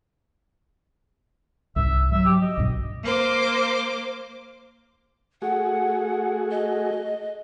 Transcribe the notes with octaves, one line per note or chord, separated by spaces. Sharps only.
C2 G#2 E5
F3 F#3 E5
G4
D#5
B1 G2 B2
A#3 C5 D6
A3 F#4 G#4 F#5
D#5